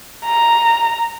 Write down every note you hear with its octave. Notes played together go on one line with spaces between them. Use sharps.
A#5